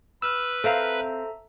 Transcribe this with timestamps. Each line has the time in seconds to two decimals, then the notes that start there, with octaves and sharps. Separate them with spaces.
0.22 B4 E6 F6
0.64 C4 A4 E5 F5 A#5